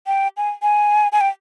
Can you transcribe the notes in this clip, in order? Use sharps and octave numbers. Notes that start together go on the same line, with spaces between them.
G5
G#5
G#5
G#5
G5